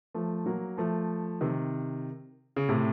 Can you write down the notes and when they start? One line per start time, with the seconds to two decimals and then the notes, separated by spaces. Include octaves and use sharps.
0.14 F3 A3
0.46 F#3 A#3
0.77 F3 A3
1.41 C3 D#3
2.56 C#3
2.69 A2 C3